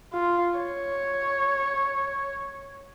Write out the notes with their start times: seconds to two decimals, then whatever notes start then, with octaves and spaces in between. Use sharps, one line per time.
0.13 F4
0.58 C#5